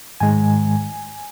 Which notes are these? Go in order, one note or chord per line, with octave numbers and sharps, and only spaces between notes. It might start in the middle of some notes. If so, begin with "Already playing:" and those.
G#2 D#3 G#3 G#5